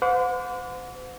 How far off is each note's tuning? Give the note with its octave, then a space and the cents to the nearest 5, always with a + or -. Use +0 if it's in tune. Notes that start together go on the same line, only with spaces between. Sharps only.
C5 -45 F#5 -40 D6 -40